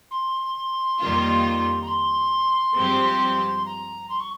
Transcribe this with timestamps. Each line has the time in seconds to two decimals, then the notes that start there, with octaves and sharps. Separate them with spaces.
0.11 C6
0.99 F2 D#3 G3 A#3 F4
1.82 A#5
1.88 C6
2.76 G2 F3 G#3 C4 G4
3.66 A#5
4.09 C6
4.20 C#6